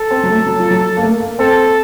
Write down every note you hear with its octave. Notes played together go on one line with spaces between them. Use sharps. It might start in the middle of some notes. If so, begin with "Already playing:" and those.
Already playing: A4
C4
F#3
A3
F#3
F3
F#3
A#3
A3
A#3
C4 A4